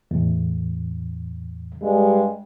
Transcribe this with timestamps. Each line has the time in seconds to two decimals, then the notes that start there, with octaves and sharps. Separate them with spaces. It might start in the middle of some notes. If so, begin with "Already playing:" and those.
0.11 E2 A2
1.82 G2 G3 G#3